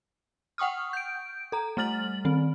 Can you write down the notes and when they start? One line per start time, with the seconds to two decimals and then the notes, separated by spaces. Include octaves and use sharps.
0.58 F#5 G5 C#6 D#6 F6
0.93 G6 D7
1.52 A4 A#5
1.77 G3 A3 F6 A6 F#7
2.25 D#3 C4